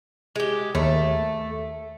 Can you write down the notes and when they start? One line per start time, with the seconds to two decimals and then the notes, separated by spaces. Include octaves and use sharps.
0.36 G#3 G4
0.75 D#2 A3